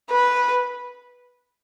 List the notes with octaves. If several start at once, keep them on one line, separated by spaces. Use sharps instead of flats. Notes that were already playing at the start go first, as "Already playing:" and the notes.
B4